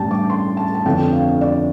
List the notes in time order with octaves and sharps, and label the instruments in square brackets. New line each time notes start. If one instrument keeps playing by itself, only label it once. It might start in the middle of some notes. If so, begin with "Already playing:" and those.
Already playing: [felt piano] A1 G2 G3 D4 G5 A5
D6
C6
A5
A5
G1 F2 D3 F3 D4 G5
F5
D5